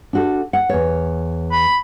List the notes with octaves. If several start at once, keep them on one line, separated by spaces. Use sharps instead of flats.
D4 F#4 A4
F#5
E2 C#5
B5